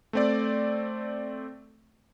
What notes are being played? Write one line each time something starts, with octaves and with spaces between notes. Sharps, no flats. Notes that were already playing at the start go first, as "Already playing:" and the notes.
A3 C4 D5